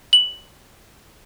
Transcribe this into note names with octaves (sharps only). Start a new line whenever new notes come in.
F#7